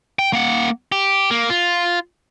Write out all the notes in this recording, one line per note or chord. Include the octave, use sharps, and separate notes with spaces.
G5
A#3 F#5
G4
A#3
F4